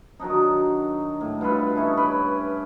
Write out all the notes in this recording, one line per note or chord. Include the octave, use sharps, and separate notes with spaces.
D#3 F#3 D4 D#4
A2
G2 F4 A4 B4
C#4 D#4 E4 C#5
C#4 B4 D5